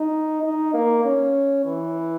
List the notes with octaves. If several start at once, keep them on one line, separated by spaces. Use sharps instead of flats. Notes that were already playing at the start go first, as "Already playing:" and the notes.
Already playing: D#4
D#4
A#3
C#4
E3